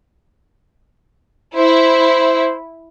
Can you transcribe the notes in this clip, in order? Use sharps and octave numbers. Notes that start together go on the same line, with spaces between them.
E4 C5